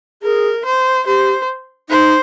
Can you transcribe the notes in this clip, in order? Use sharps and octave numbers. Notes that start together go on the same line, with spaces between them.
G#4 A#4
C5
G4 C5
D#4 C5